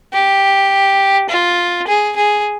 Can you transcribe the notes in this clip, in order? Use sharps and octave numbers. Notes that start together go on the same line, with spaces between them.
G4
F4
G#4
G#4